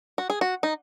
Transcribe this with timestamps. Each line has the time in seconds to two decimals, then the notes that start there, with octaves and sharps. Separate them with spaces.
0.18 F#4
0.30 G#4
0.41 F#4
0.63 D#4